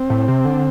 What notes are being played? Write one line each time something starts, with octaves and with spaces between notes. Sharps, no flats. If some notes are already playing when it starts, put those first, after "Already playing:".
Already playing: C4
A2
C3
D3